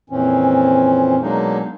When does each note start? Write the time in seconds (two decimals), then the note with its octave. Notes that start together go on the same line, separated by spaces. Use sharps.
0.10 F2 A#2 E3 C4 C#4
1.21 B2 F#3 G#3 A#3 D4 D#4